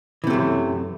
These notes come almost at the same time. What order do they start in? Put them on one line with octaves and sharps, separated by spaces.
E3 C3 A3 F#2